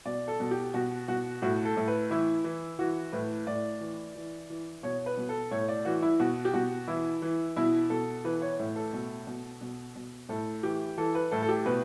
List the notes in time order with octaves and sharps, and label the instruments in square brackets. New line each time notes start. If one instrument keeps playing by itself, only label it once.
[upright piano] B2 D5
A4
B2
G4
B2 F#4
B2 F#4
A2 F#4
A4
A2
B4
E3 E4
E3
E3 F#4
A2 B4
A2 D5
E3
E3
E3
B2 C#5
B4
B2
A4
A2 C#5
D5
E3 F#4
E4
B2 F#4
G4
B2 F#4
E3 E4
E3
B2 E4
B2 A4
E3 B4
C#5
A2
A4
B2
B2
B2
B2
A2 A4
E3 G4
E3 A4
B4
A2 A4
A4
G4
B2 B4